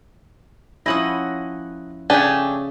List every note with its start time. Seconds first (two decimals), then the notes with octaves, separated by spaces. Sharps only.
0.86 F3 C#4 E4 D#5 F#5 D#6
2.10 C#3 A3 D4 G4 G#5